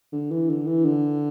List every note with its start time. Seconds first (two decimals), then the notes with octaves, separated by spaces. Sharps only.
0.12 D3
0.31 E3
0.49 D3
0.67 E3
0.85 D3